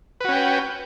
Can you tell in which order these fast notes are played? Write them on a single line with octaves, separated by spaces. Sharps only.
B4 F#4 C#4 G5